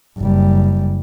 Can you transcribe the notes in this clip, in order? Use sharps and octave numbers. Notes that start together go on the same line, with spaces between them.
F#1 G3